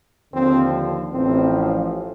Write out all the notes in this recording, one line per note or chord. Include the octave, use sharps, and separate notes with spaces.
D#2 D3 F3 C4
A1 A2 F3 C4